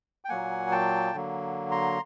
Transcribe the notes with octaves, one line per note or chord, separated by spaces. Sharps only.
G5
A#2 F#3 A#3 F#5 G#5
G5 A5
D3 F#3 A#3
A#5 C6